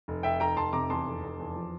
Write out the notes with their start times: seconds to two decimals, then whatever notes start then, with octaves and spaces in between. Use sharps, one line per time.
0.08 F1
0.23 F1 E5 G5
0.40 F1 G5 A#5
0.57 F1 A5 C6
0.73 C3 A#5 D6
0.90 E2 A5 C6
1.06 F1
1.23 F1
1.39 E2
1.55 F3